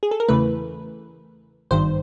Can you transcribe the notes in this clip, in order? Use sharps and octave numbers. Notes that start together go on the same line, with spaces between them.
G#4
A4
A#4
E2 C#3 E3 A3 B4
G#1 G2 D#3 C5